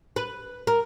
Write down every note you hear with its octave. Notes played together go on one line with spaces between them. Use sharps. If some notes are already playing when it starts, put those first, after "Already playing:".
B4
A#4